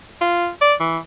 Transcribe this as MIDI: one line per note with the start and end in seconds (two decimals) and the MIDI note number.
0.21 0.49 65
0.61 0.74 74
0.80 0.98 52